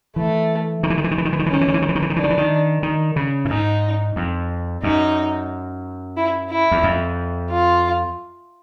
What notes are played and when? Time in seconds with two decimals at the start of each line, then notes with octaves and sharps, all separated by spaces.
0.16 E3 A3
0.83 D#3
0.90 E3
0.98 D#3
1.04 E3
1.11 D#3
1.18 E3
1.25 D#3
1.33 E3
1.39 D#3
1.46 E3
1.50 D#3 C#4
1.61 E3
1.68 D#3
1.74 E3
1.82 D#3
1.89 E3
1.95 D#3
2.02 E3
2.10 D#3
2.16 E3 D4
2.24 D#3
2.30 E3
2.38 D#3
2.83 D#3
3.16 C#3
3.45 A2
3.50 G#2 D#4
4.16 F2
4.83 F#2 D#4
6.17 E4
6.50 E4
6.71 E2
6.83 F2
7.50 F4